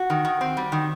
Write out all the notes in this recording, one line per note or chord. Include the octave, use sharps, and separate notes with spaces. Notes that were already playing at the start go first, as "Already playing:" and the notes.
Already playing: F#4
D#3
D#3
C4
G3
D#3